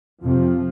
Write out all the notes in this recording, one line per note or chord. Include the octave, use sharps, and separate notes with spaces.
F2 C3 F3